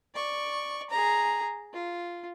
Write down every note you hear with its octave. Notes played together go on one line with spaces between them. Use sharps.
D5 C#6
G#4 A#5
F4